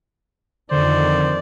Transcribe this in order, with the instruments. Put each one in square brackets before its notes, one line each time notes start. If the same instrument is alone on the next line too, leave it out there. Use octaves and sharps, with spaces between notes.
[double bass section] F2 D#3 [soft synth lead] D3 [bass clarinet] C5 [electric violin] D5